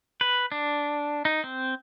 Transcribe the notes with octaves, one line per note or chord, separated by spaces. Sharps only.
B4
D4
D#4
C4